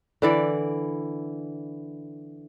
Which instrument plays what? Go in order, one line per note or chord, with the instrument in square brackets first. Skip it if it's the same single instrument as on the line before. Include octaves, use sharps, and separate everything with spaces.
[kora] D3 E3 D5